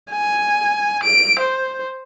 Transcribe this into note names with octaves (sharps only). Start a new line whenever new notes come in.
G#5
D7
C5